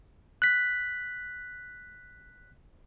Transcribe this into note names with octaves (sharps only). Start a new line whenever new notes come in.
F#6 B6